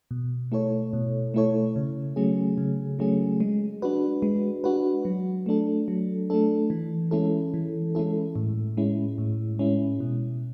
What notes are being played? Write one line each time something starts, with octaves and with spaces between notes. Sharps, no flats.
B2
A3 E4 A4 C#5
B2
A3 E4 A4 C#5
C#3
F#3 A3 C#4 G#4
C#3
F#3 A3 C#4 G#4
G#3
D4 F#4 B4
G#3
D4 F#4 B4
F#3
A3 D4 A4
F#3
A3 D4 A4
E3
G#3 C#4 E4 A4
E3
G#3 C#4 E4 A4
A2
G#3 C#4 E4
A2
G#3 C#4 E4
B2